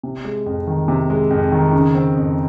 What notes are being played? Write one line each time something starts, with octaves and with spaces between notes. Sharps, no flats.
C3
G#3
F2
D#3
C3
G#3
F2
D#3
C#3
C4
F2